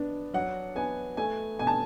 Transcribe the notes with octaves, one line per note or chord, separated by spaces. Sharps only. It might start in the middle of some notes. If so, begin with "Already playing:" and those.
Already playing: B3 D4
F#3 F#5
B3 G#5
A3 G#5
B2 G#5
A5